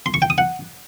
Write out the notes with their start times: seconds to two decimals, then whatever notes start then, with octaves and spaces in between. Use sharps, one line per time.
0.06 C6
0.14 C#6
0.22 G5
0.30 D#6
0.38 F#5